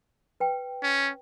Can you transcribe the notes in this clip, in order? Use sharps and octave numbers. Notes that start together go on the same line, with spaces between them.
B4 G5
C#4